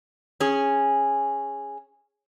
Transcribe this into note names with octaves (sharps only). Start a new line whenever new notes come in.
C#4 G#4